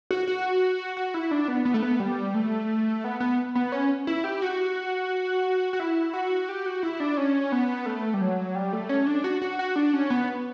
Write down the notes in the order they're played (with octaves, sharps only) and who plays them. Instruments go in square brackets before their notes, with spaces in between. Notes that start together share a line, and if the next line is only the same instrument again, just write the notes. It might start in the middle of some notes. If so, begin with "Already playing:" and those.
[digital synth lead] F#4
F#4
F#4
E4
D4
B3
B3
A3
B3
G3
A3
B3
B3
B3
C#4
E4
G4
F#4
F#4
E4
F#4
G4
F#4
E4
D4
C#4
B3
A3
G3
F#3
G3
A3
C#4
D4
F#4
F#4
F#4
D4
C#4
B3